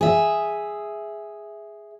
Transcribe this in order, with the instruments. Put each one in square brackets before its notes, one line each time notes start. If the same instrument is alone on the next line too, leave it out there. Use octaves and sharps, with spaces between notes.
[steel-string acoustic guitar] G#4 E5